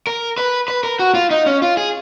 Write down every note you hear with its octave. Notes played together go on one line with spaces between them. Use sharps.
A#4
B4
B4
A#4
F#4
F4
D#4
C#4
F4
G#4